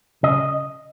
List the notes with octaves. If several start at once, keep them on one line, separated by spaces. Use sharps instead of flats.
C#3 D#5